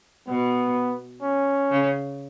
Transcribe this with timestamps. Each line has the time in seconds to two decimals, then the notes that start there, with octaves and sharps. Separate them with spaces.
0.28 B2 B3
1.23 C#4
1.71 C#3